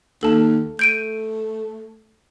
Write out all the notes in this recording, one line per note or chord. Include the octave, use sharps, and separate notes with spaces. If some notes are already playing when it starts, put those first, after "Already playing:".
D#2 A4 A5
A3 G6 D7 D#7